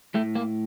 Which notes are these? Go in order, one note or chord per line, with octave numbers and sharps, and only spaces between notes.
A2 A3
A#3